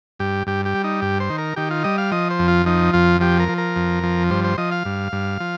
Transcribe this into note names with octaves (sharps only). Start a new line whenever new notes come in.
G2 G4
G2 G4
G4
G3
D#4
G2 G4
C5
D#3
A#4
D#3 G4
F4
G3 D#5
F5
F3 D#5
C5
F2
F4
F3 D#4
F2 F4
F3 G4
A#4
F3
A#4
F2
F3
G2 C5
C5
F3 D#5
F5
G2
G2
F3